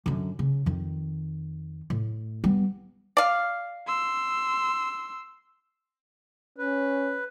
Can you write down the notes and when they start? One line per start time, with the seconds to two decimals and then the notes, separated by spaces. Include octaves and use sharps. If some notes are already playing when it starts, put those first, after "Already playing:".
0.06 F#2 D3
0.39 C#3
0.66 F2 D#3
1.90 A2
2.44 G3 B3
3.17 D5 F5
3.87 C6 E6
6.58 C#4 B4